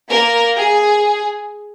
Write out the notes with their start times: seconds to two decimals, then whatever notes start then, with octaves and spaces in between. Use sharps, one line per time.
0.09 A#3 A#4
0.56 G#4